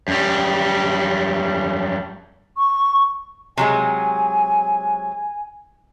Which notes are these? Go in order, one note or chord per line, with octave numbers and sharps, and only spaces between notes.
F#2 G3
C#6
C3 F#3 G#3 G#5